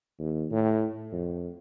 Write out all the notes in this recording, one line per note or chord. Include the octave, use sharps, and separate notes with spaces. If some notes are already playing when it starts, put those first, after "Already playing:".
D#2
A2
F2